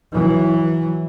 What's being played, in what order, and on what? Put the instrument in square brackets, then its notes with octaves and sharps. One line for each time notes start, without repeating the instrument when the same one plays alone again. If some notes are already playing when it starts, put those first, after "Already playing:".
[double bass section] E3 F#3